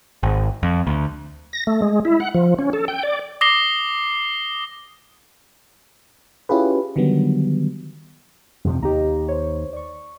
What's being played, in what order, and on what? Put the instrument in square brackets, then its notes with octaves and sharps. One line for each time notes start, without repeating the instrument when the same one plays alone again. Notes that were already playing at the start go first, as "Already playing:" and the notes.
[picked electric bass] G#1
F2
D2
[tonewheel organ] A#6
A3
G#3
E4
F#5
F3
C#4
A4
G5
D5
[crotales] D6 D#6 A#6 C7 G7
[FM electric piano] C#4 E4 F4 G4 G#4 B4
D3 D#3 F#3 G3 B3
[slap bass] F2 C3 F3
[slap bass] D#2 [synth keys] G4 D#5 A#5
[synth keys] C5 C#5
D5 C#6